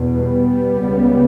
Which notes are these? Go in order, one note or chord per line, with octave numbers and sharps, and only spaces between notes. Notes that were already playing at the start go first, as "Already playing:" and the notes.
Already playing: E2 B2
G3 B3
C#2 C#3